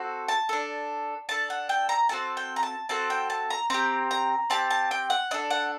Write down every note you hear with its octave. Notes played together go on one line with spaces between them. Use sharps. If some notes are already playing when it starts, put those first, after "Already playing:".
Already playing: C4 F#4 A4
A5
D4 A4
D4 A4 A5
F#5
G5
A#5
C4 F#4 A4 A5
G5
A#5
A5
C4 F#4 A4 A5
G5
A5
A#5
C4 G4 A#5
A#5
C4 G4 A5
A5
G5
F#5
D4 A4 D#5
F#5